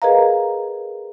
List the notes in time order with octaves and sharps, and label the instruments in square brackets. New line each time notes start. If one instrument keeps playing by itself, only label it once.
[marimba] G#4 A#4 B4 D#5 F5 A#5